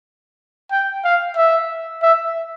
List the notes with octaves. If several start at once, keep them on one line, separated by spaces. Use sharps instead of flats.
G5
F5
E5
E5